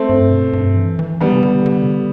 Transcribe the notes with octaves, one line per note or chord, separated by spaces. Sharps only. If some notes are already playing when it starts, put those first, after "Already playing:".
Already playing: A3 C4
G2
B2
G2
E3
E3
E3 G3 B3
C3
D3
D3
C3
D3